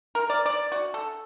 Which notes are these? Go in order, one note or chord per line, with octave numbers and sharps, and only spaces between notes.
A#4
D5
D5
F#4
A4